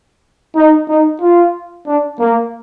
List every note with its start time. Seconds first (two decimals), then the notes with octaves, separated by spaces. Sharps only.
0.56 D#4
0.89 D#4
1.21 F4
1.87 D4
2.20 A#3